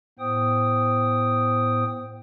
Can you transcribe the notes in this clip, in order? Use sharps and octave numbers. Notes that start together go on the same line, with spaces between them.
A2 B3 C5 G5 D#6